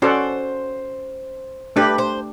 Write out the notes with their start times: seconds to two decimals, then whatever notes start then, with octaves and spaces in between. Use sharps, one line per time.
0.02 C#4 F#4 A4 C5 D5 F#5
1.76 A3 D4 G4 B4
1.98 C5